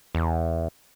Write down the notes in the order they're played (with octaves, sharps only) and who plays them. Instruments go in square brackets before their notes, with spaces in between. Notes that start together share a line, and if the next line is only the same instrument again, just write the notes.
[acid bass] E2